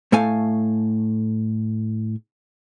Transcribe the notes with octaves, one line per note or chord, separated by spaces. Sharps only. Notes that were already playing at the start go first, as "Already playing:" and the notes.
A2 A3 A4 F5 G#5